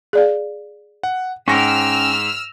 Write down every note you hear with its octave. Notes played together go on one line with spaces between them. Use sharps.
G#4 D5 F5
F#5
G#2 C#4 G5 E6 F6 A#6